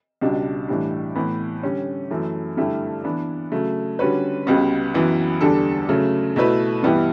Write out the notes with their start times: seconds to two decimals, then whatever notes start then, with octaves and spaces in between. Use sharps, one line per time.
0.21 C#2 B2 G3 D4
0.68 A2 E3 G3 D4
1.15 A2 E3 B3
1.63 D3 G3 C#4
2.10 F#2 E3 A3
2.57 G2 D3 A3 E4 G4
3.04 E3 B3 D4
3.52 C#3 F#3 A3
3.99 D3 G3 C#4 F#4 B4
4.47 C#2 C#3 G3 B3 F#4
4.94 F#2 E3 B3
5.41 E2 D3 G3 D4 A4
5.89 C#3 F#3 A3
6.36 B2 A3 E4 B4
6.83 G2 E3 B3 E4 G4